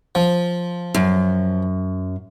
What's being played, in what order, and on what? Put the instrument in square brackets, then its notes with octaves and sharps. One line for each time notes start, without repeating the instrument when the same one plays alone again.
[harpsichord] F3
[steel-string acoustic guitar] F#2